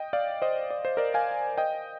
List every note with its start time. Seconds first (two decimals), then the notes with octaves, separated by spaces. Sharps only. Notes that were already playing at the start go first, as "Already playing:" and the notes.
Already playing: D#5 G5
0.13 D5 F5
0.42 C5 D#5
0.70 D5
0.85 C5
0.97 A#4 D5
1.14 F5 G#5
1.58 D#5 G5